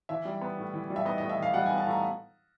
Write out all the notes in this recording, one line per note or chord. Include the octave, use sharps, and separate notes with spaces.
E3 E5
G3
B3
A2
E3
G3
E5
B3 D#5
A2 D#5
E5
E3
F5
G3 F#5
B3 G#5
A5
A2
A#5